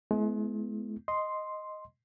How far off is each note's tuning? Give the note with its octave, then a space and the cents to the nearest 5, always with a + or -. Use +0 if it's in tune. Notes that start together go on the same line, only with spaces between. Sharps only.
G#3 +40 B3 +20 E4 +0
D#5 +0 C6 +0